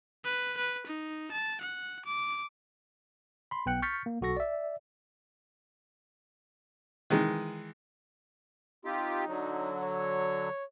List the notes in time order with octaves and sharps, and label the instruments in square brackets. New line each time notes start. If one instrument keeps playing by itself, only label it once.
[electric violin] B4
B4
D#4
A5
F#5
D6
[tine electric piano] B5 C6
B1 B3 G5 F#6 C#7
C#6 F6 G6 A6 B6 C#7
A#3
B1 F#4 A4 C#6 A#6
D5 E5
[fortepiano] D#3 E3 G#3
[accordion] C4 F4 G4 [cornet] D#4
[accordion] D3 F#3
[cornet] C#5